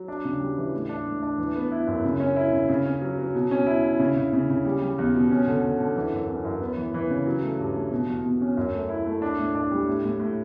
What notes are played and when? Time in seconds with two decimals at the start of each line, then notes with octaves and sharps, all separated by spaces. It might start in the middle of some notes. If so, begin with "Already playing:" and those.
Already playing: F#3
0.08 D4
0.25 C#3
0.40 G3
0.58 E3
0.74 A2
0.89 D4
1.06 A2
1.23 D4
1.38 E3
1.55 B3
1.71 E4
1.87 F#2
2.05 C#3
2.20 C#4
2.36 E4
2.53 C#3
2.69 C#3
2.85 C#4
3.01 F#3
3.18 F#3
3.34 B2
3.51 C#4
3.67 E4
3.84 E4
3.99 C#3
4.16 C#3
4.33 C#3
4.49 C#3
4.65 G3
4.81 G3
4.98 E2
5.14 B2
5.31 C#4
5.47 D3
5.63 D3
5.80 D3
5.96 E3
6.12 F#2
6.29 C#4
6.45 F#2
6.61 B3
6.77 E3
6.94 E3
7.10 C#3
7.26 F#3
7.43 A3
7.59 G2
7.76 A3
7.92 B2
8.09 E2
8.24 B2
8.41 C#4
8.57 F#2
8.74 A3
8.89 E4
9.06 A3
9.22 D4
9.38 A2
9.55 D4
9.71 G3
9.87 A2
10.04 A2
10.20 A2